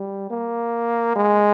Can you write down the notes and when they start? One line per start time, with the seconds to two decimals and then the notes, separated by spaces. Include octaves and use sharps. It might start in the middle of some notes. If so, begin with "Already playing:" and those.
Already playing: G3
0.30 A#3
1.16 G#3